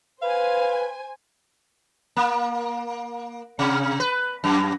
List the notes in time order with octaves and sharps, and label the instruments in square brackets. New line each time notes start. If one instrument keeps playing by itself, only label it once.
[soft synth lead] B4 [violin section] C5 G#5 [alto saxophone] F5
[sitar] A#3
C3
B4
F#2